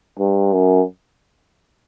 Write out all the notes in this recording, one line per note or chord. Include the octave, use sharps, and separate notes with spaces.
G2
F#2